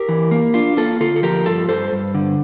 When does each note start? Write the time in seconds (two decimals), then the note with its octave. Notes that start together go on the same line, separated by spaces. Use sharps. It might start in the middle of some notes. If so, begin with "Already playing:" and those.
Already playing: G4 A#4
0.09 E3
0.31 A#3
0.54 D4 F4
0.77 A#3 F4 A4
1.00 D3 F4 A4
1.16 A4
1.23 F3 G4 A#4
1.46 G2 F4 A4
1.68 G2 A4 C5
1.92 G2
2.15 D3